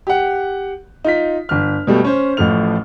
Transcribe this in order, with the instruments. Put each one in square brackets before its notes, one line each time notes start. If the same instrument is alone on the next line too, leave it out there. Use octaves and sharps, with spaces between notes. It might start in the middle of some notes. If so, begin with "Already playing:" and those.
[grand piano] G4 F#5
D#4 F4 B6
G1 F6
B2 G3 A3
C#4 C5
A1 A2 F3 A3 F6 F7